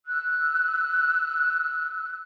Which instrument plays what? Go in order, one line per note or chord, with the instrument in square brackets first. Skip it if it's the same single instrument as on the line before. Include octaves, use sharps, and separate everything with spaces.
[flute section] E6 F#6